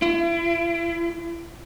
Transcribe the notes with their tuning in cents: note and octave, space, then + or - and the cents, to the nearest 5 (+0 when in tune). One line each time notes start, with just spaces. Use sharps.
E4 +40